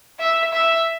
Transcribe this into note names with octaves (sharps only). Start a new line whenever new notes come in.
E5
E5